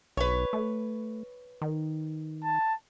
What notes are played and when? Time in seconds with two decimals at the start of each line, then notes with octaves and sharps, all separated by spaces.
0.17 B1 B4 C#5
0.53 A3
1.62 D#3
2.44 A5